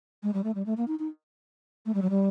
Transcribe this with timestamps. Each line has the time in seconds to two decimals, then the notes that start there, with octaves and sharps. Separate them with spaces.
0.23 G#3
0.34 G3
0.44 A3
0.55 G3
0.66 A3
0.77 A#3
0.88 D#4
0.99 D#4
1.86 A3
1.94 G3
2.02 F#3
2.10 G3